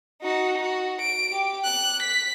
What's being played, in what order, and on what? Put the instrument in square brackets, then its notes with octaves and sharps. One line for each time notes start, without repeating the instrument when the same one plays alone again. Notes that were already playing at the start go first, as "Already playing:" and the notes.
[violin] D#4 F#4
F#4
D7
G4
F#6
B6